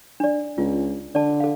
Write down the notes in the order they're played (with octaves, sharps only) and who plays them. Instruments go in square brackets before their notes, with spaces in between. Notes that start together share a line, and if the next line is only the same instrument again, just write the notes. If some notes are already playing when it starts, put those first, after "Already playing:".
[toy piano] D4 D5
[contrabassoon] C#2 [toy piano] F4
[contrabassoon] D3 [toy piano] D5 A5
[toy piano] A4 F5